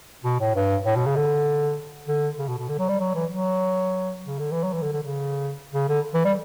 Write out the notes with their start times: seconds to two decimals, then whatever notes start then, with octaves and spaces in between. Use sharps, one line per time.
0.24 B2
0.40 A2
0.55 G2
0.86 A2
0.96 B2
1.06 C#3
1.16 D3
2.08 D3
2.39 C#3
2.48 B2
2.58 B2
2.68 D3
2.78 F#3
2.89 G3
3.00 F#3
3.15 E3
3.30 F#3
4.26 C#3
4.39 D3
4.52 E3
4.63 F#3
4.73 E3
4.82 D3
4.92 D3
5.03 C#3
5.74 C#3
5.89 D3
6.14 E3
6.25 G3